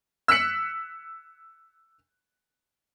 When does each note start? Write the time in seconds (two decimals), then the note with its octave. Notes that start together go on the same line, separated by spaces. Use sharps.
0.28 E6 F#6 B6 C#7 F#7